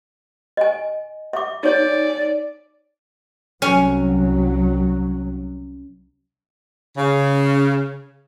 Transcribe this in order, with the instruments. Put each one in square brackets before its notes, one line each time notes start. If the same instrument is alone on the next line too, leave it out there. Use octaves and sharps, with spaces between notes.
[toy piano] D#5 G#5
E5 D6
[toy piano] D#4 C#5 [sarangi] D5
[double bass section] C2 F#3 [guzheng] C#4
[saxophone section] C#3